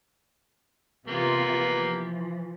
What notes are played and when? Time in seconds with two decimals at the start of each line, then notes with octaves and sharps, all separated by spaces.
1.08 C3 E3 A#3 B3 F4 G4
1.72 E3 F3